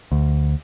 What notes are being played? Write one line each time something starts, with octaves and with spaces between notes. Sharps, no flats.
D2